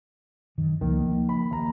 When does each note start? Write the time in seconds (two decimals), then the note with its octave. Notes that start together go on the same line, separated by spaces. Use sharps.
0.58 F#2 D#3
0.81 C#2 D#3 F3 A#3
1.02 F3 A#3
1.29 B5
1.51 D#2 A#5